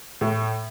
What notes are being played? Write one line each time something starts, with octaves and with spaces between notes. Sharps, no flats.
A2